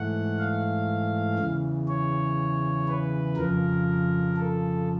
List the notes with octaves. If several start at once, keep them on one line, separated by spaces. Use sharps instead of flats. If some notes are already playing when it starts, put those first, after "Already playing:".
Already playing: G#2 E3 A3 F#5
F5
E2 C#3 E3
C#5
B4
F2 C#3 F3 A#4
A4